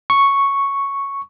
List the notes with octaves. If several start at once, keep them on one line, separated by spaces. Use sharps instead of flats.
C#6